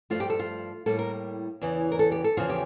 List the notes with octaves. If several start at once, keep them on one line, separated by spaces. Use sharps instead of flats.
G2 F3 A3 F4
G4
A4
F4
A2 G3 A#3 A4
A#4
E2 C#3 E3
A#4
A4
G4
A4
E2 C#3 F3 F4
G4